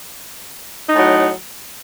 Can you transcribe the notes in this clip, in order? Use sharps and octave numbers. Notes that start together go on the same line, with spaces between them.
A2 F#3 D#4